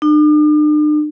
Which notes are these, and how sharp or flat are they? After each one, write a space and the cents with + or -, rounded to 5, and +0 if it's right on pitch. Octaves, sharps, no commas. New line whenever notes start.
D4 +45